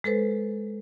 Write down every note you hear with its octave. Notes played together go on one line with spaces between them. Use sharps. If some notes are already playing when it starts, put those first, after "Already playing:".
G#3 A4 B4 C5